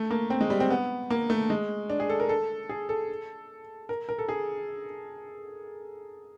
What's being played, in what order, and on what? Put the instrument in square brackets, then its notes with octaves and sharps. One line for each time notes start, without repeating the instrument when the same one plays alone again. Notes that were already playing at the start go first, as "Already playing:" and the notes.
Already playing: [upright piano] A3
A#3
C4
G#3
G3
C4
B3
A#3
A3
G#3
D4
G#4
A4
A#4
A4
G#4
A4
A#4
A#4
A4
G#4